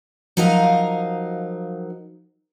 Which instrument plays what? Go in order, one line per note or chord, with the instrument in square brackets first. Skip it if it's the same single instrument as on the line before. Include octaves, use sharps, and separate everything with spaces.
[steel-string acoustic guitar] F3 F#3 D#4 A#4 D#5 F5